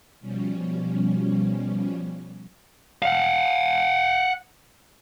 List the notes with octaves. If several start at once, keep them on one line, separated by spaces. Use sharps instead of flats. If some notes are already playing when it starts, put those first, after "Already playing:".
B2 F3 G3 C#4
F5 F#5